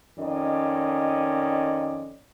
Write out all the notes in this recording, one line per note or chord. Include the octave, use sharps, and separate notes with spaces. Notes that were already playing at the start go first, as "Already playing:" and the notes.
F2 D#3 C#4 D5 D#5